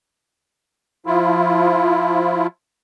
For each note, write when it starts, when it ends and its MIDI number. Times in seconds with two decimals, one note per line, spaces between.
1.06 2.47 53
1.06 2.47 64
1.06 2.47 65